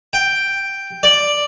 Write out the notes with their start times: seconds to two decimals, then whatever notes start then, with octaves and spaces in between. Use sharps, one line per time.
0.13 G5
1.03 D5